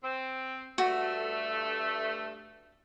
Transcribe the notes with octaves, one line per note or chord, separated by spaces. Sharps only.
C4
G2 A3 F#4